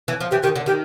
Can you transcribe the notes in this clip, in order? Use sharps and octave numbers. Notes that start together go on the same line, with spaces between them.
E3
F3
E3 G4
D#3 G4
D3
D#3 G4